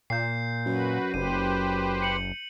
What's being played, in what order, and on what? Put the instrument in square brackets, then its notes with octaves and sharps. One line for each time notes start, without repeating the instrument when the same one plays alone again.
[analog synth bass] A#2 [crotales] G6 C7
[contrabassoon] F#2 [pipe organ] F#4 B4
[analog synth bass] F#1 [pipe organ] G4 B4 C5 [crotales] D#7
[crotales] C#7 F#7